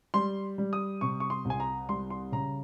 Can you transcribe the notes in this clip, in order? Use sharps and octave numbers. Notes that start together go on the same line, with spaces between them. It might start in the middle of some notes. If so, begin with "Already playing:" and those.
G3 C6
G3
D#6
C3 C#6
C#6
C6
C2
G#5
A#5
G3 C6
C6
C#3 A#5